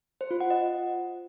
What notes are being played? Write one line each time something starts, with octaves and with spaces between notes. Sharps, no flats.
C5
F4
F#5
D#5